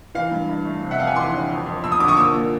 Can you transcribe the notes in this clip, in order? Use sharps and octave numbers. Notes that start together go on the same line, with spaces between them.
E3 F5
G2
G2
A3
C3
E5 F#5
F2 F5 G5
F#5 G#5
E3 C6 D6
G1
F2
F2
F2 E6
D#6
D3 D6
C#6 D#6
A#2 D6 E6
A#2